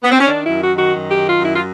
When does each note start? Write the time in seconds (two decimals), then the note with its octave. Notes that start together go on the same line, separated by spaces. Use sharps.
0.03 B3
0.11 C4
0.19 C#4
0.27 D#3 D4
0.44 E4
0.49 F#2
0.61 F#4
0.72 D#3
0.77 F#4
0.94 F#2
1.11 G4
1.16 D#3
1.28 F4
1.38 F#2
1.44 E4
1.54 F4